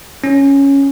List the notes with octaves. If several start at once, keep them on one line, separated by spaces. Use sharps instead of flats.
C#4